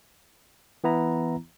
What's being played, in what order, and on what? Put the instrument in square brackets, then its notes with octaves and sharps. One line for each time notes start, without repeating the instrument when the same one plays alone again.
[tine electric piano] E3 B3 E4 A#5